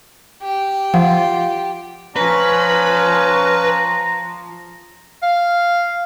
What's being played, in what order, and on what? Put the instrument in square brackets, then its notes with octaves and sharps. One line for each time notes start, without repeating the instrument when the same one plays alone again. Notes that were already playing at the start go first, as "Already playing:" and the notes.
[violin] G4
[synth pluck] F3 [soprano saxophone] F4 [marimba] F#5
[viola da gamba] F3 [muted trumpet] C#4 [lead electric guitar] B4 [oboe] A#5
[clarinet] F5